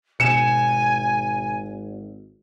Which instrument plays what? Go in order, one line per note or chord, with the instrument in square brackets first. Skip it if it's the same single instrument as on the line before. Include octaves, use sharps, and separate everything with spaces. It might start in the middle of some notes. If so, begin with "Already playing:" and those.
[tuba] G#1 [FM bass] B2 [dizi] G#5 [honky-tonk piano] C#7 E7